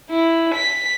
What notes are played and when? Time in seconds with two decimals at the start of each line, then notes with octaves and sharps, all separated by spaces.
0.10 E4
0.55 B6